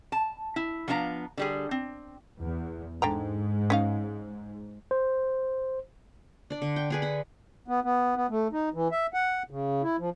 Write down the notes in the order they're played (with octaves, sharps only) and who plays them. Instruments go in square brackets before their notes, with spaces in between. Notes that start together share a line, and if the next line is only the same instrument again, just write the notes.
[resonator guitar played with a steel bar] A5
E4
F3 B3 D4 F5 A#5
D3 G3 G#4
C4
[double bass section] E2
[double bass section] G#2 [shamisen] D3 G5 A#5
[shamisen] C#4 D#4 F5
[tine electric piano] C5
[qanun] D4 D5
D3
G5
D4 G#4 B4
F#5 B5
[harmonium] B3
B3
B3
A3
D#4
E3
E5
F#5
C#3
E4
F3